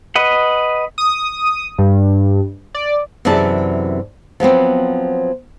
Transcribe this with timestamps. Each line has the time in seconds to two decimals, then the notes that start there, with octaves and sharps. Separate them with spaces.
0.16 B4 D#5 F#5
0.98 D#6
1.78 G2
2.74 D5
3.25 F#2 C3 E3 G#4 D5 A5
4.40 F3 F#3 B3 C4